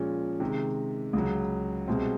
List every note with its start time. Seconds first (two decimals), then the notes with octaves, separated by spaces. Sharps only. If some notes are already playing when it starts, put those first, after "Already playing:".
Already playing: A#2 F3 G#3 C#4
0.40 C3 D#3 G#3
1.13 C#2 C#3 F#3
1.88 C2 B2 G#3 C4